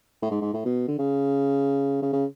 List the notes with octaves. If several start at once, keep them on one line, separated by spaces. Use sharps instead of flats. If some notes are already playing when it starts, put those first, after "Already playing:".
A2
G#2
G#2
A2
B2
D3
C#3
C#3
C#3